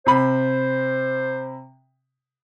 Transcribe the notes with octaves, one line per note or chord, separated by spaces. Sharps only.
C3 C5 B5